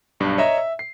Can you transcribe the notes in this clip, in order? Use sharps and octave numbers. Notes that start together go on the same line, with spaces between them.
B1 G2 D4
C#5 D#5 E5 A#5
E5
C7